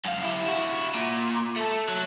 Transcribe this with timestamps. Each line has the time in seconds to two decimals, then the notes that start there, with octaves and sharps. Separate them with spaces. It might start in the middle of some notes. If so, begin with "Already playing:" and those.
0.05 F#2 F5
0.23 E4 G4
0.48 E4 F#4
0.95 A#2
1.57 A3 A4
1.89 F#3